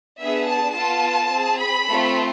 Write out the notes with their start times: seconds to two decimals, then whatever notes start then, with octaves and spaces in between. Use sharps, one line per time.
0.19 B3 D4 G#4 E5
0.48 A5
0.76 B3 F4 A4 A5
1.31 C4 G#4
1.60 B5
1.88 A3 C4 F4 A4